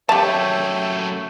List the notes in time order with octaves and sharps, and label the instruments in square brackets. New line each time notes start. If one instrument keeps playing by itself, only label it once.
[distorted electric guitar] F#2 A3 [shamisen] G4 A5 [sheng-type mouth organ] C#5 E5 G5